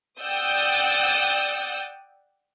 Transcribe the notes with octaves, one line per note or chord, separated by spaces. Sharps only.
D5 F#5 G5 D#6 E6 G6